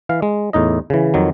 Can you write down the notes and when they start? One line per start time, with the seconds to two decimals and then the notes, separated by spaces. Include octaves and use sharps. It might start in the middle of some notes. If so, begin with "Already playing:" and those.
0.09 E3 F5
0.22 G#3
0.53 E2 A2 D#4 D#5
0.90 C#3 E3
1.14 F2 D#3 F#3